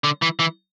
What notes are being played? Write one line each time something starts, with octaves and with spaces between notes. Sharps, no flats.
D3
E3
E3